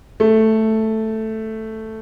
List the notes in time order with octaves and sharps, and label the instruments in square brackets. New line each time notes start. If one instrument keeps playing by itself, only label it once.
[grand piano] A3